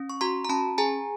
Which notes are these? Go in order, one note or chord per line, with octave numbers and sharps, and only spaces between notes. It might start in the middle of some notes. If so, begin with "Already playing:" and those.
Already playing: C#4
C#6
F#4 A#5 C6
A#5
C#4 A5 B5
G#4 G#5 A#5